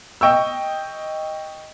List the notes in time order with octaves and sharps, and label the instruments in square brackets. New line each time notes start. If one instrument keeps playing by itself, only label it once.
[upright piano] D#5 G5 C#6 E6